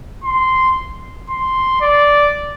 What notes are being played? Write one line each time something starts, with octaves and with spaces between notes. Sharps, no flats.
C6
C6
D5